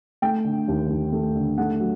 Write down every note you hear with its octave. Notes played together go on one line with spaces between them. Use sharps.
A3 G5
D3
D#2
D#2
A3
D3
A3 F#5
F#3